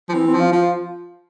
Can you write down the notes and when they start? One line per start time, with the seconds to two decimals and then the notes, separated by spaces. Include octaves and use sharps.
0.09 F3
0.14 E3 C4
0.27 C4
0.34 F3
0.40 F4
0.53 F3 F4